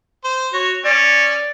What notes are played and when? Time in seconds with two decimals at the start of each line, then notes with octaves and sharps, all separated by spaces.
0.24 C5
0.53 F#4 C#5
0.85 C#4 D5